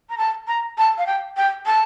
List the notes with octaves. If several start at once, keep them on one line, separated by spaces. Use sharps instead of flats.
A#5
A5
A#5
A5
F5
G5
G5
A5